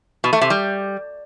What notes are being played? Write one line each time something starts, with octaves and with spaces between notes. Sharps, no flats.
B2
A3
C3
G3